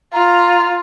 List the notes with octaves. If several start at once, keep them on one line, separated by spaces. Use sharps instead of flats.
F4 A#5